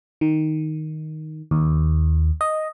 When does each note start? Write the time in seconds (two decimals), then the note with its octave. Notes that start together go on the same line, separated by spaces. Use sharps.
0.21 D#3
1.51 D#2
2.41 D#5